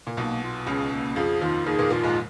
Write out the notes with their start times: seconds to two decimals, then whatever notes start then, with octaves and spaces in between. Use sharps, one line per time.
0.07 A#2
0.17 B1 B2 A#3
0.43 F4
0.66 C#2 C#3 G#4
0.92 A#3
1.16 F2 F3 G#4
1.41 D#2 D#3 F4
1.66 D#2 D#3 G#4
1.78 A#2 A#3
1.91 A#2 A#3 F4
2.04 G#2 G#3